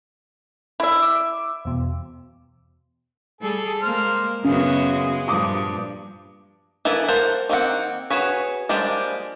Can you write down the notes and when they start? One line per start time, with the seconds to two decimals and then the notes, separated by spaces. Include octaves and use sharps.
0.80 E4 E5
1.02 D6 E6
1.65 E2 B2
3.41 G3 G#4 A4
3.82 G#3 A#3 C5 F6
4.44 F#2 C#3 G#3 B3 F#4
5.28 G2 A#2 F3 D6 D#6
6.85 E3 A#3 B3 E4 A4
7.08 A#4 C5 F5 F#5 A5
7.49 D#3 A#3 C4 F#5
8.10 F#4 G#4 B4 C#5
8.69 F3 G3 G#3 A#3 D4